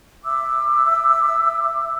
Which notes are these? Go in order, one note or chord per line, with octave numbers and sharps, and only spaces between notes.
E5 D6 E6